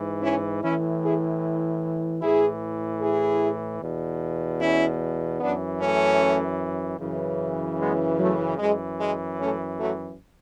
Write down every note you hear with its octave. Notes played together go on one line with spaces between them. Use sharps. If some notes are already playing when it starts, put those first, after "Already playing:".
Already playing: G#2 E3
C#4 E4
A2 E3 C#4 E4
E4 G#4
A2 E3 E4 G#4
E4 G#4
E2 B2
C#4 E4
F#2 E3 B3 D4
A3 C#4
F#2 C#3 E3
G#3 B3
F#3 A3
F#2 E3 G#3
G#3
A3 C#4
F#3 A3